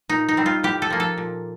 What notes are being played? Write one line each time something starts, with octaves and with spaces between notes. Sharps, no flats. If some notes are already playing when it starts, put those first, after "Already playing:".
A#2 D#4
D#4
G3 C4
F4
A2 G4
A4
F3 A#3
A4
A#2